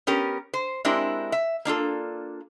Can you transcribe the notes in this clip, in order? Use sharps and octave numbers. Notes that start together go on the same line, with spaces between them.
B3 C#4 G4 A#4
C5
G#3 C4 D4 E4 G4 A#4
E5
A#3 D4 F4 A4